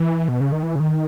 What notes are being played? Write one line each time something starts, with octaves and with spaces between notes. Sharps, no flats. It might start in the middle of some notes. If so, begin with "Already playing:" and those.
Already playing: E3
B2
C#3
D#3
E3
C#3
D#3